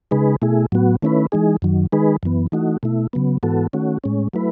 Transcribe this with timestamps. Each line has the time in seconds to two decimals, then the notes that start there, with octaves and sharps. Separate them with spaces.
0.11 C#3 G#3 D#4 G#4 B4
0.42 B2 A3 E4 G#4
0.72 A2 F#3 B3 F#4
1.02 D#3 A3 C#4 E4 B4
1.32 E3 G#3 D#4 G#4
1.62 F#2 D#3 F#3
1.92 D#3 G#3 D#4 G#4 B4
2.23 F#2 E3 B3
2.52 E3 A3 D#4 F#4
2.83 B2 A3 E4
3.13 C#3 F#3 B3
3.43 G#2 E3 B3 F#4 A4
3.73 D#3 A3 C#4 F#4
4.04 A2 G#3 C#4
4.34 F#3 A3 E4 B4